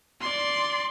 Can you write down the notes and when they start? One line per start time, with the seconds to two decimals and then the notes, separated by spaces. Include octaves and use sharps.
0.21 D5 C6